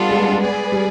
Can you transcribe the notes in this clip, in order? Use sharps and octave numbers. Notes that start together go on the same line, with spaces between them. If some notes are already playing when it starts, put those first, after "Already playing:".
Already playing: G3 B3 D4 F4 A4
G#3
G3
G#3
G#4 B4 D5
G3